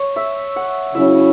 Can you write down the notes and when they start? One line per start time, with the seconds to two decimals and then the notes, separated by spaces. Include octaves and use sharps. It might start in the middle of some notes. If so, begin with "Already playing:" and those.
Already playing: C#5
0.16 E5
0.56 F#5
0.95 C#3 F#3 C#4 E4 E5